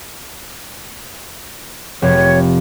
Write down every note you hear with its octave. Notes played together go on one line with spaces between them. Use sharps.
F1 C#5